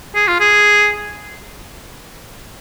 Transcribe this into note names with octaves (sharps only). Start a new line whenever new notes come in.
G#4
F4
G#4